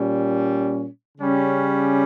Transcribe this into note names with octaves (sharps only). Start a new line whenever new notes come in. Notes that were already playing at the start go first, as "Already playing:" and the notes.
Already playing: A#2 G3 C#4
C#3 G3 C#4 G4